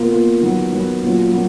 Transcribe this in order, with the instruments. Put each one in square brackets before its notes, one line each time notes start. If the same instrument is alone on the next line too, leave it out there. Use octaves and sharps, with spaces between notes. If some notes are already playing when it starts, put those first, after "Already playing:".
Already playing: [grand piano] B2 A#3 F4
B2 A#3 F4
D#3 F#3 B3
D#3 F#3 B3
A#2 F#3 C#4 F4
A#2 F#3 C#4 F4